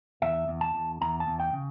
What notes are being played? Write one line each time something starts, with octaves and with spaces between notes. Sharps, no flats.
E2 E5
E2
A5
E2
E2 A#5
A5
E2
G5
C#3